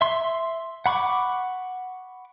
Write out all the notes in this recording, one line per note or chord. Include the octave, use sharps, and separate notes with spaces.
E5 C6
F#5 B5 C#6 D6